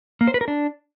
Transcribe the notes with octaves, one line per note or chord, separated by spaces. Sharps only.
A#3
C5
B4
A#4
D4